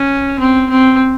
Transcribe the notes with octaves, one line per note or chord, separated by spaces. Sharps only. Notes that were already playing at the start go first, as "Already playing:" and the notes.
Already playing: C#4
C4
C4